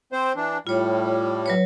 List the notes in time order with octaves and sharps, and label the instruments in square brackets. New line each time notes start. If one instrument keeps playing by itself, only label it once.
[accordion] C4 C5
E3 D4
[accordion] A2 G3 [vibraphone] F4 C#5
[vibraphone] F#3 B4 C#5